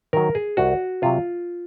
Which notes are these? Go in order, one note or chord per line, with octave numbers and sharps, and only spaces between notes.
D#3 F#3 A#4
G#4
C2 F#4
C3 F#3 F4